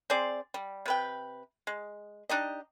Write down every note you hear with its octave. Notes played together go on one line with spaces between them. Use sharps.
C4 G#4 C5 D5
G3
C3 B4 G5
G#3
D4 D#4 G4 D#5